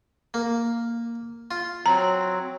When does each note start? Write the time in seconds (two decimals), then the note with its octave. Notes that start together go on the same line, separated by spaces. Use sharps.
0.34 A#3
1.51 F4
1.86 F#3 C4 A#5